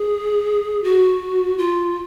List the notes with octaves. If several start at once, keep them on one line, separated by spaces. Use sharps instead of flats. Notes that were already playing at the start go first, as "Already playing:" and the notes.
Already playing: G#4
F#4
F4